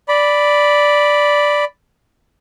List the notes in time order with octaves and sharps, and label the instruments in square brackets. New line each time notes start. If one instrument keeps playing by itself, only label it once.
[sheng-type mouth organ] D5 B5